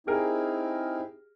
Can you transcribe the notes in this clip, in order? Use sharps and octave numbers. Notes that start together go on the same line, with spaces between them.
C4 D#4 E4 G4 G#4 A#4